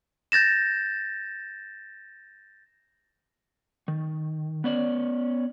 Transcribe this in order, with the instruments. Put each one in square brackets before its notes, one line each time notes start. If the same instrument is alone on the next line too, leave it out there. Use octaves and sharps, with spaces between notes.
[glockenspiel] G6 A6 A#6 E7
[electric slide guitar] D#3
B3 C#4 D5